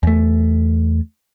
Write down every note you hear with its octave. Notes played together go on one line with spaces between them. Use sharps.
E2 A3